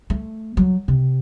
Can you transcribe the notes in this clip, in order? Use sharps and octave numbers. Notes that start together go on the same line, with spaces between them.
A3
F#3
C3